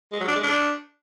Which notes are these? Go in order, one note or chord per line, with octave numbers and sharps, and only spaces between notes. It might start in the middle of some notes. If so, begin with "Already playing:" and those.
G#3
F#3
D4
G#3
D4